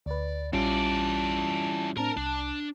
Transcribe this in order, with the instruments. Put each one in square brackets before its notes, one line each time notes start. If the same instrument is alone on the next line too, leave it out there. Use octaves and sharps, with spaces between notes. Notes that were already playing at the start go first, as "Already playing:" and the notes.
[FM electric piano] D2 B4 [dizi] D5
[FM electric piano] A#1 [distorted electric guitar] E3 D5 [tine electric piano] G3 C#4 F4 [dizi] A5
[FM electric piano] A2 C4 D4 [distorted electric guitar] A#4 A#5 [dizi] A5
[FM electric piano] C2 [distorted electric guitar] D4